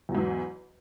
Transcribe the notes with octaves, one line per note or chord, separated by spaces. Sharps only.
E2 G#2 E3 F#3